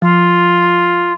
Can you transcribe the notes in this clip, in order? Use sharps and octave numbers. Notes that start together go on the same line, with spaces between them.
F3 F4